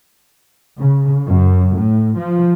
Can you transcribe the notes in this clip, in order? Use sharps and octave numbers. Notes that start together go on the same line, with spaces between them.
C#3
F#2
A2
F3